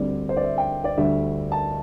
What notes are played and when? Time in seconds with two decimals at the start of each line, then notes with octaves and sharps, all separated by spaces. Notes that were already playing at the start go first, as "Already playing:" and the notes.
Already playing: D2 D3 G3 C4 D5
0.29 C5
0.37 D5
0.43 E5
0.58 G5
0.84 D5
0.97 D2 D3 G3 E5
1.52 A5